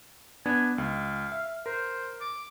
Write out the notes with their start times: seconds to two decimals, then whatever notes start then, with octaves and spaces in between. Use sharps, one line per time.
0.46 B3 D4 G#5
0.78 C#2 F5
1.32 E5
1.66 A#4 C5
2.21 D6